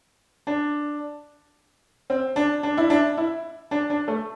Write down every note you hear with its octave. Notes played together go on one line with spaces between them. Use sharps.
D4
C4
D4
D4
E4
D4
E4
D4
D4
A3